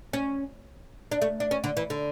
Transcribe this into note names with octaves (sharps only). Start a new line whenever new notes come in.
C#4
D4
A3
D4
C#4
D3
E3
D3